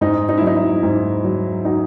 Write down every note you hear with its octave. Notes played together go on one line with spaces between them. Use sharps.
G#2 D#4
D#4
E4
F#3 D#4
D#4
G#2 D#4
F#3
D#4 F#4